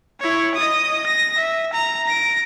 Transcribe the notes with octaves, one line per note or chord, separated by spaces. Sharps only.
E4 C#5
D#5 D#6
A#6
E5
A#5
A#6 D7